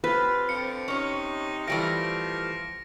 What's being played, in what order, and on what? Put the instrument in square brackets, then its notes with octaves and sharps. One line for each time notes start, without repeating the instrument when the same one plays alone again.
[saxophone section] C3 C4 F4 [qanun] B4
[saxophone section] D3 F3 C4 [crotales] C#7
[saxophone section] C3 D#4 [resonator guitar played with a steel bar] C#4 C#5
[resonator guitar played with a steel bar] E3 G3 A3 [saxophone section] F3 [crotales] A#6 D7